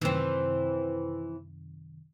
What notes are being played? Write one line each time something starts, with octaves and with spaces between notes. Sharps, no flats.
F#2 C3 D#3 E3 C4